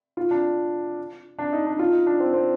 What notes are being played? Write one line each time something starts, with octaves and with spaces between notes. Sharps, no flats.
F4
D4
D4
D#4
D4
F4
D#4
D4
C4
C4